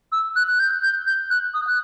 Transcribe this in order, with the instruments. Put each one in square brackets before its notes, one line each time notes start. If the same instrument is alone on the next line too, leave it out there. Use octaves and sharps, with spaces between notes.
[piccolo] E6
F#6
F#6
G6
G6
G6
F#6
D#6
F#6